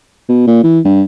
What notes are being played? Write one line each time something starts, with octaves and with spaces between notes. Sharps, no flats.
B2
A#2
E3
G2